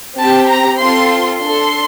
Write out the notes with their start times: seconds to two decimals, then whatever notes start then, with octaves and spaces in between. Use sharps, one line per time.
0.18 C4 G4 A5
0.49 A#5
0.79 C4 F4 A4 C6
1.40 D4 A4 C6